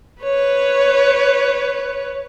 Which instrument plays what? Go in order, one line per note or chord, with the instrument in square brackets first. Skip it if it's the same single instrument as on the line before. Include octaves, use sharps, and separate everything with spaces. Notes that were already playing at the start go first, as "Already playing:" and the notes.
[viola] B4 C#5